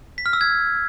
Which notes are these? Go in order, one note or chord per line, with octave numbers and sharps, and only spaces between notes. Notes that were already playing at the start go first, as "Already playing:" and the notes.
B6
F6
E6
G#6